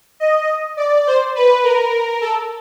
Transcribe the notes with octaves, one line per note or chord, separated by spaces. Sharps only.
D#5
D5
C5
B4
A#4
A4